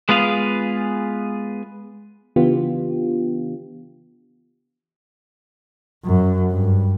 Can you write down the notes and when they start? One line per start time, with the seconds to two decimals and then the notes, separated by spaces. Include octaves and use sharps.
0.09 G#3 B3 F4 G#4 F5
2.36 C#3 E3 B3 D4 F4 G4
6.04 F#2
6.51 G2